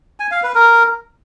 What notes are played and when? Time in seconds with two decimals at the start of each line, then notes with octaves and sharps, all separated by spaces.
0.20 G#5
0.31 F5
0.43 B4
0.55 A#4